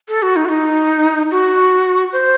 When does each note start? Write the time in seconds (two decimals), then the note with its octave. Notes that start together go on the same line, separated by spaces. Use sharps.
0.09 A4
0.23 F#4
0.36 D#4
0.45 F#4
0.49 D#4
1.31 F#4
2.13 C5